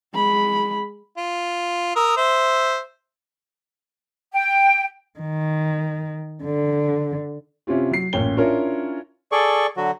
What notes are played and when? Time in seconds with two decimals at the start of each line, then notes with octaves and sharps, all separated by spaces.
0.14 G#3 B5
1.18 F4
1.96 A#4 D#6 E6
2.17 C5 E5
4.33 G5
5.19 D#3
6.44 D3
7.67 C3 C#4 E4 F4 G4
7.91 F#3 C7
8.13 A1 A#2 C#4 C#5 G5 G7
8.37 C#4 D4 E4 F4 A#4 C#5
9.32 G#4 A4 D5 C#6
9.77 D3 F#3 F#4